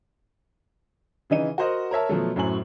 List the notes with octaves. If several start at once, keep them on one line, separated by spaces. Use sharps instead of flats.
C#3 E3 D#4 D#7
F#4 A#4 C5 D#5 F#5
A#4 C#5 E5 A5
B2 F3 F#3 A3
F#2 A2 F#3 C5 G#5 F#7